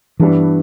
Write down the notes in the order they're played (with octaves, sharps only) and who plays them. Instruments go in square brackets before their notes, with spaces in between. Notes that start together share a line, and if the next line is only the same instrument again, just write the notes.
[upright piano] G2 G3 B3 D4 [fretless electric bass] E3